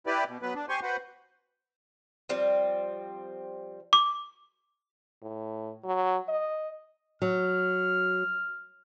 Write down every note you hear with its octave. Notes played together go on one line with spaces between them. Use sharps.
E4 G4 B4 D5
B2
F#3 B3 B4
D4
G4 C5 G#5 C6 C#6
F#4 B4 C5 F#5
F3 G3 C4
D6
A2
F#3
D#5
F#3 F6